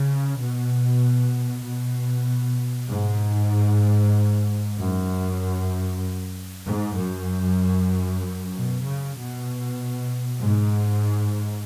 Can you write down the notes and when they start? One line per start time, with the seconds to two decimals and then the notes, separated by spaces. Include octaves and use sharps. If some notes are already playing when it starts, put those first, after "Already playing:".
Already playing: C#3
0.39 B2
1.64 B2
2.89 G#2
4.78 F#2
6.65 G#2
6.96 F#2
8.53 B2
8.84 C#3
9.16 B2
10.40 G#2